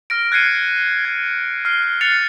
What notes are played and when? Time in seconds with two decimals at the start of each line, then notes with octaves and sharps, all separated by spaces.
0.10 F6 A#6 D7
0.32 F#6 G#6 A6 C7 C#7 D#7
1.05 G#6
1.65 F6 C7
2.01 F6 F#6 A6 C7 C#7 F7